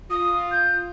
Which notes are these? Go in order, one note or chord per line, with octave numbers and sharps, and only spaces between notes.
F4 D#6
G6